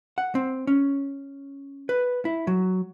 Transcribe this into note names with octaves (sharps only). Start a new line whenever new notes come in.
F#5
C4
C#4
B4
E4
F#3